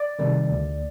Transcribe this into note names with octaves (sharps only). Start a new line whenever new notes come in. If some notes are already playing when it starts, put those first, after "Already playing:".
Already playing: D5
C3 D#3 G3
D2